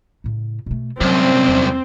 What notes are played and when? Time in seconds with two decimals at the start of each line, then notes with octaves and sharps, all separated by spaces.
0.24 A2 C#3
0.66 B2 A3
1.01 C2 F#2 F#3 C4
1.48 E2